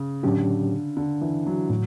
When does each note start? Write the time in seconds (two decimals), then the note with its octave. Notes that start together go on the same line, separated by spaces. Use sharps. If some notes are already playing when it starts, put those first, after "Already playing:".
Already playing: C#3
0.23 A2 D3 F#3 C#4 G4
0.97 D3
1.21 E3
1.46 F#3
1.70 A2 F#3